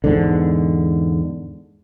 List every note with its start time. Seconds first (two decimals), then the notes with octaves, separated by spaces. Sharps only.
0.04 E2 G#2 D3